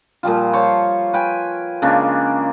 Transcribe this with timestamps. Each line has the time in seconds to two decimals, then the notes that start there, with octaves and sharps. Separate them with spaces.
0.23 A#2 F3 G3 F4
0.53 C5 C#5 A5 C#6
1.13 B4 G5 G#5
1.82 C#3 G#3 A#3 D4